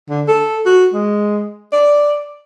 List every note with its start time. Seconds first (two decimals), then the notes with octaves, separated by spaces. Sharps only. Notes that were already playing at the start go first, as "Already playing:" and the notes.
0.09 D3
0.28 A4
0.66 F#4
0.94 G#3
1.73 D5